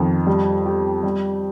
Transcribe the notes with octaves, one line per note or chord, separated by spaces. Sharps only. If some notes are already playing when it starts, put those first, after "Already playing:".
Already playing: F2 D#3
G3
G4
G3